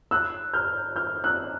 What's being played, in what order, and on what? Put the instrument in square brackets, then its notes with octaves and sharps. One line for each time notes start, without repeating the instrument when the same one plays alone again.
[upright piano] E6 F#6
F6 G6
F6 G6
E6 F#6